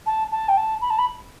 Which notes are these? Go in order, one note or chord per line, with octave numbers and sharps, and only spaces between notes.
A5
A5
G5
A5
B5
A5
B5